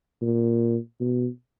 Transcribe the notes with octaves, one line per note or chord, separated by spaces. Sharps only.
A#2
B2